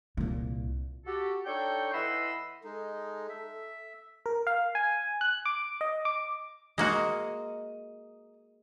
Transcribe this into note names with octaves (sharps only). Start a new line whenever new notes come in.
C2 A#2
F#4 G4 A4
D4 D#4 A4 C#5 G5 C#6
E3 D#5 F#5 B5 C6 E6
G#3 D#4 A4
E5
A#4
F5
G#5
F#6
D6
D#5
D6
G#3 A#3 F#4 D#5 A#5